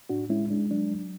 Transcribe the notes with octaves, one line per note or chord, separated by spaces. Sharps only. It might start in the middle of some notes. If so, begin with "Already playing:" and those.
A2 D4 F#4
G#3 C#4 E4
G#3 D4
F#3 D4
F#3